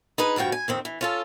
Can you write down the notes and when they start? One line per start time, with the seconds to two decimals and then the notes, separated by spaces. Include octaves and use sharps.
0.18 D#4 G#4 B4
0.36 D2 G2 F3 F#4 G5
0.52 G#5
0.68 F2 D#3 C4
0.85 E3
1.01 C#4 F4 A4